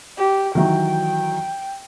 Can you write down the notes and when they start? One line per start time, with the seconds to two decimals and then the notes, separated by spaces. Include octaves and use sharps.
0.18 G4
0.55 D#3 E3 F#3 G5